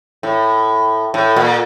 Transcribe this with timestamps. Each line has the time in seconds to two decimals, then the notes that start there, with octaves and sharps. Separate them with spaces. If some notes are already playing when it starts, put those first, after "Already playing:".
0.23 A2
1.14 A2
1.36 A#2